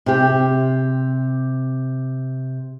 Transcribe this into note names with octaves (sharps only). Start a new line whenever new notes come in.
C3 G4